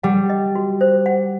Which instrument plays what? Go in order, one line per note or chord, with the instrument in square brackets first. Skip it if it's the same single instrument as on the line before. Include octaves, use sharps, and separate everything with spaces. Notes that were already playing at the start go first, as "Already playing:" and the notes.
[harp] G3 [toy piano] F#5
[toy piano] D#5
F#4
C5
F#5